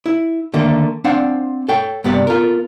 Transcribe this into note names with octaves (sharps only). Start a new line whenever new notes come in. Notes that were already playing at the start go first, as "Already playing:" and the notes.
E4
D3 D#3 A3 A#3
C4 D4 F5 F#5
A4 C#5 G5
G2 C3 B3 G4 D5
B3 F4 A4 A#4